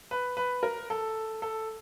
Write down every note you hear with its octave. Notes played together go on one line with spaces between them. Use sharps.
B4
B4
A#4
A4
A4